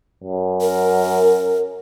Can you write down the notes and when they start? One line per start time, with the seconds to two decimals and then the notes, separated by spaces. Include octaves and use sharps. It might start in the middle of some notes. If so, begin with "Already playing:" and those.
0.24 F#2
0.61 A#4